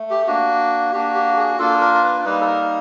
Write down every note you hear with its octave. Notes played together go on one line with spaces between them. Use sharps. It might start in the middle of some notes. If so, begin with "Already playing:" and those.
Already playing: A3
G4
A#3 D4 F#4
A#3 D4 F#4 G4
G4
G#4
A#3 D4 F4 A4
A#4
A#4
B4
G3 A#3 D#4 B4
A4
A#4